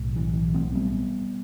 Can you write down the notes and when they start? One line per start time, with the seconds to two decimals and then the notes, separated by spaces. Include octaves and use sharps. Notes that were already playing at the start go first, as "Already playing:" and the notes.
Already playing: B1 A2
0.16 E3
0.54 A3 C4
0.74 G3 B3